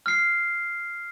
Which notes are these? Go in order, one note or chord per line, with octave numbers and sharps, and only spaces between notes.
F6 C7